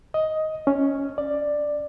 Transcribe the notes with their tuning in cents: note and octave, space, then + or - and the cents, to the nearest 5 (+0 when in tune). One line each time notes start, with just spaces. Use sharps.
D#5 +10
C#4 +5
D5 +10